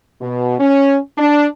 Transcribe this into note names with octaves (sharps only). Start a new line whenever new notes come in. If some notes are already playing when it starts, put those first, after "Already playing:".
B2
C#4
D4